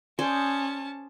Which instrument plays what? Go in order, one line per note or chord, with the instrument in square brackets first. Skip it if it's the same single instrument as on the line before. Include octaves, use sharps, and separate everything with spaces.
[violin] C#4 A5 [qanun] G#4 C5 D5